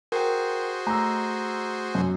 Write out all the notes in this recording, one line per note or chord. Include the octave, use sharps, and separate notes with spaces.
F#4 G#4 A#4 C5 G5
A3 A#5 E6
F#2